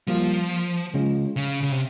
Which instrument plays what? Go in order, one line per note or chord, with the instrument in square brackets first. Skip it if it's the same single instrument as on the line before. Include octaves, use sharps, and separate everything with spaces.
[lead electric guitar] F3 [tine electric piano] G3 A#3 F4
[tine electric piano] C#3 G#3 C#4 F4
[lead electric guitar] C#3
C#3
C3